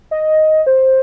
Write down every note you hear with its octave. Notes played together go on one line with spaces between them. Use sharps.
D#5
C5